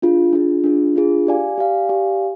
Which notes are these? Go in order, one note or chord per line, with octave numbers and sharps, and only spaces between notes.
D4 F4 G#4
D4 F4 G#4
D4 F4 G#4
D4 F4 G#4
G4 D5 F5 G#5
G4 D5 F5 G#5
G4 D5 F5 G#5